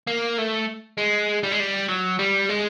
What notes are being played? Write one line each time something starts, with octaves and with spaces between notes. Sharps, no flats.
A#3
A3
G#3
G3
G#3
G3
F#3
G3
G#3